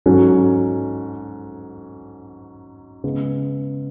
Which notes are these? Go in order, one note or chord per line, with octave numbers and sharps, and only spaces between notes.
G#2 F#3 C#4 F#4 A4
C#3 G#3 B3